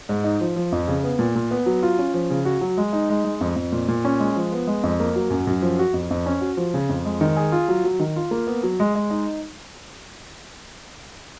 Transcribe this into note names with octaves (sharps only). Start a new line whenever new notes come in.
G#2
D#4
F3
F3
F2
C#3
B3
A#2
A#2
B3
F#3
F4
C#4
F3
C#3
F#4
F#3
G#3
D#4
G#3
G#3
F2
F2
A#2
A#2
C#4
G#3
F3
B3
G#3
F2
A#3
F#3
F#2
F#2
F3
F#4
F2
F2
C#4
F#4
F3
C#3
F2
G#3
D#3
G#4
F4
F#3
F#3
D#3
F4
A#3
B3
F#3
G#3
G#3
D#4